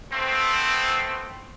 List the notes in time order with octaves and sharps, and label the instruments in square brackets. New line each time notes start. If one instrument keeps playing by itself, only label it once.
[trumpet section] A3 B3 C4